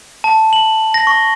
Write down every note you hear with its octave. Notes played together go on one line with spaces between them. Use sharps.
A5
F#7
A#6
C#6